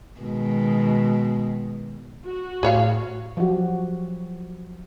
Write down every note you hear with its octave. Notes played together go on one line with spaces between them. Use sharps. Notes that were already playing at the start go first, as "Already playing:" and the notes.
B2 D#3 G#3
F#4
A2 G#4 C#5 F5
F3 F#3 F#4 G4